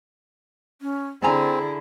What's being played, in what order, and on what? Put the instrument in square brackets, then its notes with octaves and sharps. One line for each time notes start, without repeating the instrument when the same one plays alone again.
[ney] C#4
[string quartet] D3 E4 [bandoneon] C4 [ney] G#4 [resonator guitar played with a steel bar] D5 G#5 A#5